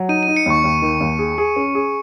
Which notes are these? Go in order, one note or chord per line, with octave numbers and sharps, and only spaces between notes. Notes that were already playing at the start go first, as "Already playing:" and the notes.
Already playing: F#3
D#4 D#7
D#7
D#4
C#7
D#2 C#6
D#2
D#3
D#2
G#4
G#4
C#4
G#4